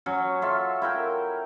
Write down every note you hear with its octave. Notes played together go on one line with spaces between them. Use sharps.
F#3 C#4
F4 A4 E5 F5
E4 A#4 G5